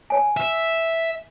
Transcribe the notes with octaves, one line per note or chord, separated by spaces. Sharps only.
C#5 G#5
E5